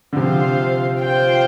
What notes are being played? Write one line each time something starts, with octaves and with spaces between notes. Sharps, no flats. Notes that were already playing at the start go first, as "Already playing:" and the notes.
D3
C3 F3 F4 C5 F5
F4 C5 G5